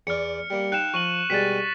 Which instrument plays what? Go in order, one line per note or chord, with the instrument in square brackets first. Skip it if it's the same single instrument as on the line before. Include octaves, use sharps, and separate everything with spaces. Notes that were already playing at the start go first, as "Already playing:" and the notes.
[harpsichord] E2 D5 C#6 [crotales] F6 C#7
[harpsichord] G3 A#3
[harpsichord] D#4 F5 G5 [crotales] F#6 E7
[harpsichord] F3 [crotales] C#6 D#7 F#7
[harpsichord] B2 G3 G#3 [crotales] A6 B6